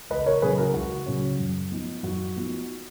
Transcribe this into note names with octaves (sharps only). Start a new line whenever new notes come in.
C#2 B4 D#5
A#4 C#5
C#3 F#3 C#4 G#4 B4
F#4 A#4
C#2 F#4
C#3 F#3 C#4
F#2
F3 B3 D#4
F#2 F#4
F3 B3 D#4